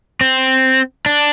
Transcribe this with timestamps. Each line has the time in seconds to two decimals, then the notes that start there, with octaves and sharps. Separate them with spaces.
0.21 C4
1.06 D4